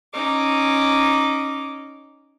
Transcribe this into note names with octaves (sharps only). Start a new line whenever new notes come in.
C#4 D#4 D6